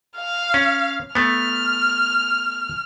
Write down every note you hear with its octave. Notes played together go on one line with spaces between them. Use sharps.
F5
C#4
A3 B3 F6